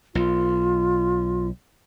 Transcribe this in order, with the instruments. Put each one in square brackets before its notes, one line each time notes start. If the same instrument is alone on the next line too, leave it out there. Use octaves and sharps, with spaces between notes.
[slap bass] B1 [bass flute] F4